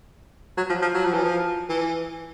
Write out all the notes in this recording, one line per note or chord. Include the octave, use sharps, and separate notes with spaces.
F#3
F3
F3
F#3
F3
E3
F3
E3